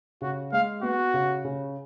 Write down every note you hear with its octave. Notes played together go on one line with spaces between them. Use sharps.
C#3 F#4
G#3 F5
B3 F#4
C#3
C#3